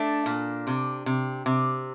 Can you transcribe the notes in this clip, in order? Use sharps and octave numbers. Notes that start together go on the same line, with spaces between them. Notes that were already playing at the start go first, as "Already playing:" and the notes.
Already playing: A3 D4
A#2
C3
C3
C3